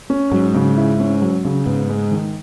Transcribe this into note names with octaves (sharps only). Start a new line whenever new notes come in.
C#4
G#2 F#3
C#3
E4
C#4
F#3
C#3
G#2 B3
G#3
D#3